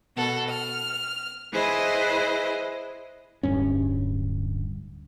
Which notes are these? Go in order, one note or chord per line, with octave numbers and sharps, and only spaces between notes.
B2 A4 F#5
F6
E4 G#4 B4 C5 D#5
D1 G2 C#4